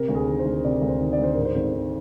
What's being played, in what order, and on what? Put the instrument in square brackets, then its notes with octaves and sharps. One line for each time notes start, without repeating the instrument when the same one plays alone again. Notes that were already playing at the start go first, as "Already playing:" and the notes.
Already playing: [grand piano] C3 A#4
D2
G#4
D#3
C5
D2
C3 D5
D2
C5
D#3
D5
D2 C5
G#2 A#4
C5
G#1
D#3